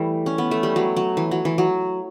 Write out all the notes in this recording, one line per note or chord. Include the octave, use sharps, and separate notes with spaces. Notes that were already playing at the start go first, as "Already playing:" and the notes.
Already playing: E3 G3 A3
C#4
B3
A3
G3
F#3
F#3
E3
F#3
E3
F#3